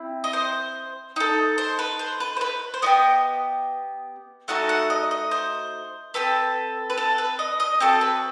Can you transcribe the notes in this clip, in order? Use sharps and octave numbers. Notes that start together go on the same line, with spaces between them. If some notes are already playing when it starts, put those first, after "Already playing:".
Already playing: C4 E4
D#5
C5
D#4 A4
C5
B4
C5
B4
C5
B4
C5
B3 D#4 G4 D#5
A3 D#4 F#4 A4 F#5
F#5
D#5
D#5
C5
C4 F#4 A4 B4
B4
A4
B4
D#5
D#5
C4 F#4 A4
B4